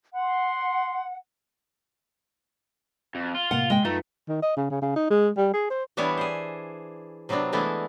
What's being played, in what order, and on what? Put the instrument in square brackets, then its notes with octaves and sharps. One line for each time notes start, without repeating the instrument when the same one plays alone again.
[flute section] F#5 [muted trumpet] C6
[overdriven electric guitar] F2
[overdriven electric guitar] F4 [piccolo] G7
[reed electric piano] A2 C3 A#3 [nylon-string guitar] F#5
[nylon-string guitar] G#3 G5
[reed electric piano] F#2 F4 B4 [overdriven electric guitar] A3 [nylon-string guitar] D#4
[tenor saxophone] D#3
D#5
C#3
C#3
C#3
D#4
G#3
G3
G#4
C5
[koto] E3 G3 B3 D4 E4 C#5
G#4 C5
C3 F#3 B3 C4 D4
E3 G#3 A3 B3 D4 E4